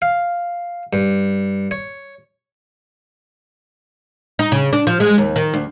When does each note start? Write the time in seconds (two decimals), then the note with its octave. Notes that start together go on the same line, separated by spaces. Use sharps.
0.02 F5
0.93 G2
1.71 C#5
4.39 D#4
4.52 C#3
4.73 D4
4.87 F3
5.00 G#3
5.18 D#2
5.36 D#3
5.54 D2